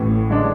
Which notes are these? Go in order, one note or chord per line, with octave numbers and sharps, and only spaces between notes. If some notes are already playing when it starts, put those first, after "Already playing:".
Already playing: A1 A2 E3
D3 G#3 D4